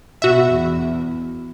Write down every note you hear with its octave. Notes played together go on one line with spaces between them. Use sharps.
B2 F#4 E5
E2